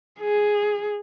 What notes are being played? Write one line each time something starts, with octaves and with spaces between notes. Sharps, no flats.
G#4